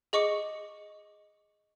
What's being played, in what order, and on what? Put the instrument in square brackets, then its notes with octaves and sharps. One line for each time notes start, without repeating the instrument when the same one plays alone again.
[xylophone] G#4 D#5 C#6 D6 C#7